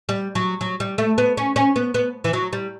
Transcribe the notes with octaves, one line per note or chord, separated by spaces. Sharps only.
G3
F#3
F#3
G3
A3
B3
C#4
C#4
B3
B3
E3
F#3
G3